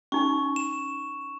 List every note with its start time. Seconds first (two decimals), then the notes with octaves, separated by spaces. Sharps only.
0.12 C#4 D#4 G#5 C#6
0.56 E7